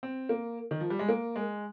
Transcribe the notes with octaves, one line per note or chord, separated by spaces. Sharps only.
C4
A#3
D#3
F3
G3
G#3
A#3
G#3